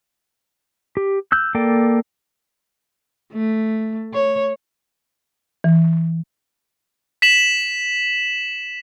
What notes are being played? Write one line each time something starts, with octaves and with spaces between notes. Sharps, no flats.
G4
E6 F#6 G6
A#3 A4 D5 G5
A3
C#5
E3
B6 E7 F#7